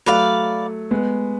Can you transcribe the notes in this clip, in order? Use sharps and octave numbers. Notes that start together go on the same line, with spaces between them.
F#3 A3 B4 D5 F5
G#3 B3